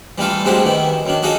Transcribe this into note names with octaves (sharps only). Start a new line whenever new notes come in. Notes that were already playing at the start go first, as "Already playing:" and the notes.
E3 G3 A3 F4 A4
G2 G#3 C4 D4 F#4 G4
D#3 E3 E4
F#2 D#3 D4
F4 F#4 G#4 A4 D#5